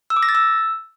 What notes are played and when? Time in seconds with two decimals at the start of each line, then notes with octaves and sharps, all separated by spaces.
0.10 E6
0.16 D6
0.23 A#6
0.29 A6
0.35 E6